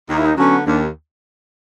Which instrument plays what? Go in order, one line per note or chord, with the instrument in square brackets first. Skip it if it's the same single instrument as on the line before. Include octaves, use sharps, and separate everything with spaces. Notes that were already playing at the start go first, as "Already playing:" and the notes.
[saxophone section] D#2 [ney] D#4
[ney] E4
D#4
[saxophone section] D3 F#3 B3 [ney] C#4
[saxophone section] D#2 [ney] D4